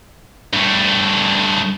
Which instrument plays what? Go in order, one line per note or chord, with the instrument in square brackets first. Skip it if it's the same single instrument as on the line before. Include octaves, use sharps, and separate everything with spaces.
[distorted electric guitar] G2 A3